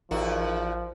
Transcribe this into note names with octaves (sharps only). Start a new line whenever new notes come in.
A1 E2 D#3 F3 F#4